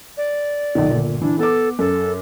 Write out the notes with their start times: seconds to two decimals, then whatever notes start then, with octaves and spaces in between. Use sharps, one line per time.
0.17 D5
0.75 B1 A#2 D#3
0.90 G1 A#2
1.21 E3 D4
1.39 B3 A4 D6
1.79 F#2 A4